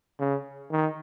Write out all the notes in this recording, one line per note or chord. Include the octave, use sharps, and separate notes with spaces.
C#3
D#3